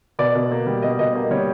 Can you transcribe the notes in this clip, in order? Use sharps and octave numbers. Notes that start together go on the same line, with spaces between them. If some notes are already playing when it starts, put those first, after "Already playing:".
B2 D5
B2
A#3
G3
B2 D#5
B2 D#5
A#3
G3 C#5